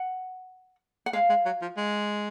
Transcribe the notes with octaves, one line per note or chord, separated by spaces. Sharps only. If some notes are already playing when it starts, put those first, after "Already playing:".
Already playing: F#5
F#5
G#3 F5
G#3
F#3
F3
G#3